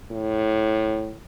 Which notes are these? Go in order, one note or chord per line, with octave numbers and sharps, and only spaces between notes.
A2